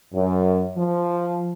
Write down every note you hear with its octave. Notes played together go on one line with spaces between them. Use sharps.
F#2
F3